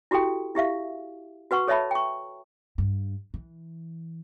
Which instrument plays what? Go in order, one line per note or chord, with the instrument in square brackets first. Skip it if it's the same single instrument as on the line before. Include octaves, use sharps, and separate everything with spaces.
[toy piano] E4 F#4 G4 A4 G5
E4 G4 E5 F5
F#4 B4 F#5 C#6
A4 C#5 D#5 E5 A5 B5
G5 C#6
[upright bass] G2
E3